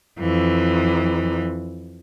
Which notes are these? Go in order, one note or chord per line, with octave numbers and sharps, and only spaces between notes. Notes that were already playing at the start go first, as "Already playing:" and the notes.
F2 E3